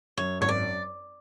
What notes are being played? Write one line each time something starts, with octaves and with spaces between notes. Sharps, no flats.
F#2 C#5
G#1 C#5
D5